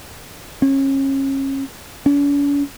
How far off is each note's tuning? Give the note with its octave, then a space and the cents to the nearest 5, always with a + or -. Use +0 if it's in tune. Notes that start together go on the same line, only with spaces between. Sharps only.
C#4 -30
C#4 +45